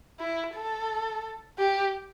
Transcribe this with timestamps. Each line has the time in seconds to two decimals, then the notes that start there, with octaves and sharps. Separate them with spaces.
0.20 E4
0.55 A4
1.59 G4